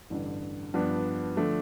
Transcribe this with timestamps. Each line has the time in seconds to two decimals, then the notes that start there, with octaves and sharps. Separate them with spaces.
0.10 A1 G2 D3
0.74 G2 F3 B3 D4
1.37 D3 F3 A3 D4